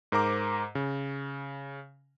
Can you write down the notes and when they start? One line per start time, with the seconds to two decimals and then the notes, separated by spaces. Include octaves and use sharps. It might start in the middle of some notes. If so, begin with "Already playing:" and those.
0.12 G#2 A#4 C5 A#5 D6
0.75 C#3